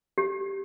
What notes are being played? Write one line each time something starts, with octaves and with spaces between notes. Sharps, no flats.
G4